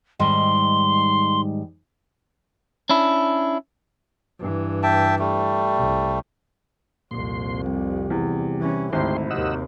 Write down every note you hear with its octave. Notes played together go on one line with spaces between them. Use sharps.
G#2 D#3 G3 C6
C#4 D4 E4
G2 E3
E5 G5 A5
G3 A3
C2
C2 F2 A#2 C6
C3 G3
E2
E3 C#4
G#1 D2 E4 G4 C6
D#2 C3 D#5 F#5 E6